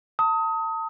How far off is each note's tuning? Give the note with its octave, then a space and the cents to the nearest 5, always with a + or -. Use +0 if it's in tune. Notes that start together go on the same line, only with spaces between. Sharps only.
A5 +35 D#6 +25